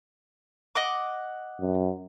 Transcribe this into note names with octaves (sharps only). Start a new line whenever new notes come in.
D#5 F#5 D6
F#2